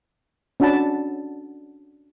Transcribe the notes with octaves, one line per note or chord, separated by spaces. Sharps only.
C#4 D4 F#4 F#5 A5 B5